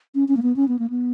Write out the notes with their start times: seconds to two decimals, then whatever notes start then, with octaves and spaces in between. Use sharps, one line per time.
0.15 C#4
0.28 C#4
0.37 A#3
0.43 B3
0.56 C#4
0.68 B3
0.79 A#3
0.90 B3